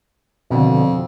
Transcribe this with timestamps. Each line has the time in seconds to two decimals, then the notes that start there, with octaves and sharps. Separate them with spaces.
0.50 F2 B2 D3